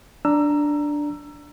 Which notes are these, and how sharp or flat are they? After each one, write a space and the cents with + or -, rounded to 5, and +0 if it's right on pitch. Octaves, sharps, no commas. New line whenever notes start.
D4 +0 A#5 +0 E6 +20